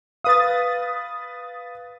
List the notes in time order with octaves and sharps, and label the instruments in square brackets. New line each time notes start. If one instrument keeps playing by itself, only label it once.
[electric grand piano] B4 F5 [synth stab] D#6 A6